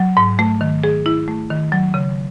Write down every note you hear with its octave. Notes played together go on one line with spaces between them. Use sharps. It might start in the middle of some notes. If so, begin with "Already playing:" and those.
Already playing: F#3
G#2
A3
D#3
G#4
E4
A3
D#3
F#3
C#3